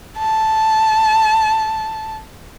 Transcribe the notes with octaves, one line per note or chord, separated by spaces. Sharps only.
A5